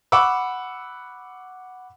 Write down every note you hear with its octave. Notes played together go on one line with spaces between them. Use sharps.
F#5 B5 C#6 D6 E6